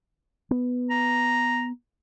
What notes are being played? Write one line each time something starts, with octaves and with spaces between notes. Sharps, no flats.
B3
A#5